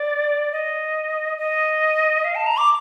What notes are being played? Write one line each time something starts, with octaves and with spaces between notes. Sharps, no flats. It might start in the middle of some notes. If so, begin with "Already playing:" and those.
Already playing: D5
D#5
D#5
F5
A5
A#5
D6